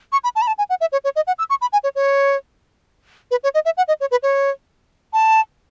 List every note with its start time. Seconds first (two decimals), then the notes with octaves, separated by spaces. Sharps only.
0.12 C#6
0.24 B5
0.35 A5
0.42 B5
0.47 A5
0.58 G#5
0.70 F#5
0.81 E5
0.92 C#5
1.04 C#5
1.16 D#5
1.27 F#5
1.38 E6
1.50 C#6
1.61 B5
1.73 G#5
1.84 C#5
1.95 C#5
3.31 B4
3.43 C#5
3.54 D#5
3.65 E5
3.77 F#5
3.88 D#5
4.00 C#5
4.11 B4
4.23 C#5
5.13 A5